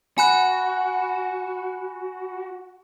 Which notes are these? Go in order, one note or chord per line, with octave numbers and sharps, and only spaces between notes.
F#4 G#5 B5 F#6